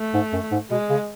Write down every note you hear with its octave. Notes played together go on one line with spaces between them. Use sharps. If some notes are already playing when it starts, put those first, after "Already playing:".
Already playing: A3
G#2
F#2
G#2
B2 G#3
C#3